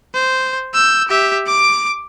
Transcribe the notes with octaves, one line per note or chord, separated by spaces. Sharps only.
C5
E6 G6
G4 E5
D6 D7